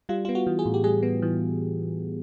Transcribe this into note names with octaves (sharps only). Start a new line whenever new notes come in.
G3 F4
B3 F4
F#4
E3
G#4
A2
G4
G3 G#4
B3
E3